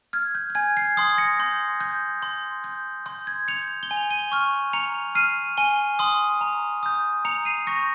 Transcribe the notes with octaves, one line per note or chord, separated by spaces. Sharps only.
F6 G#6
G6
G6
G#5 G#6
G#6 C7
C6 D#6 G#6 C7
A#6 C#7
C6 G6
G6
C6
G6
C6 G6
G#6
G6 C#7 F7
G7
G#5
F7
D#7 G7
C#6 F6
A#5 C#7 F7
F6 C7 D#7
G#5 D#7 G7
C6 D#6
A#5
D#6 G6
A#5 C#7 F7
C7 D#7
C#6 G6 A#6 C#7